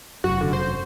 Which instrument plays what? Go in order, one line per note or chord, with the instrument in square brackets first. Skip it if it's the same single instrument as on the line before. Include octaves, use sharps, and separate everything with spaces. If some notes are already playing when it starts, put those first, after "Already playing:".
[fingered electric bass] F1 F#2 [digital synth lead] F#4
[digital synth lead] D3
C5